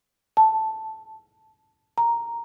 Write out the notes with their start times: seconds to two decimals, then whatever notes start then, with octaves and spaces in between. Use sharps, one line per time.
0.37 A5
1.98 A#5